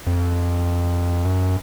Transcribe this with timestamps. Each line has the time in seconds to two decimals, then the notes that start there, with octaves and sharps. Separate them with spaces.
0.07 F2
1.25 F#2